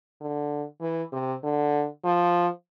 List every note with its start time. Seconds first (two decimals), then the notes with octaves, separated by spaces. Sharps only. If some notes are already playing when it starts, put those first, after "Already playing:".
0.21 D3
0.81 E3
1.12 C3
1.43 D3
2.05 F3